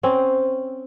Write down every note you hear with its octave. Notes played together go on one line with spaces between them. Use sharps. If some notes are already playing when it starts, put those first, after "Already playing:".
C4 C#4